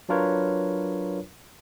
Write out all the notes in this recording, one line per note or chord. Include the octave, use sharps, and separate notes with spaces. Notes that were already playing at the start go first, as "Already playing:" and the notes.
F#3 D4 F4 A#4 B4 C#5